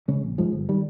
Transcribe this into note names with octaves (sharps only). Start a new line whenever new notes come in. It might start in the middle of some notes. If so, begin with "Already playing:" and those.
C#3 G#3 C#4
A#1
G#2 F3 G#3
G1
D#3 G3